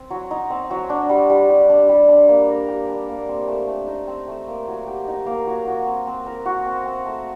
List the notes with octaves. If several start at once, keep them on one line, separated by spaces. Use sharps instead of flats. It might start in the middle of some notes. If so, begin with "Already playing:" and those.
Already playing: C4
F#3
D#4
C4
F#3
D4
G3
G3
G4
D4
G3
D4
A#3
A#4
G4
D4
A#3
C4
A3
A3
D#4
C4
A3
A#3
F#3
G4
D#4
A#3
F#3
F#4
C4
C4
A#4
F#4
C4
C4
A3